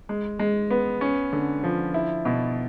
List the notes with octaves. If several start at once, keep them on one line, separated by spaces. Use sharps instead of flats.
G#3
G#3
B3
C#4
D3
F3
E4
B2